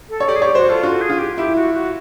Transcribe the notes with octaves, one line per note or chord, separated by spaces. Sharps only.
A4
C#5
G4 D5
G#4
G4 C#5
F#4 C5
F4 A4
F4 F#4
G#4
F4
G4
E4 G4
F#4
F#4